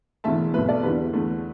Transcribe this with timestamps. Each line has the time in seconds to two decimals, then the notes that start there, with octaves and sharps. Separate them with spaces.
0.24 E1 E2 D3 A3 E5 A5
0.54 B1 B2 A3 B4 E5
0.68 A4 D5
0.83 E1 E2 D3 G4 B4
1.13 E2 D3 A3